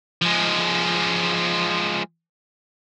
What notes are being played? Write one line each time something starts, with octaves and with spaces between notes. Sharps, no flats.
F3 G#3